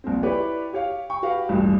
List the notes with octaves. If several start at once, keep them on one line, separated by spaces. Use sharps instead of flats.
A#1 C4
E4 G4 B4 C#5 D5
G4 C#5 F5
G5 C#6
F#4 G4 B4 F5 G5
D#1 A1 G2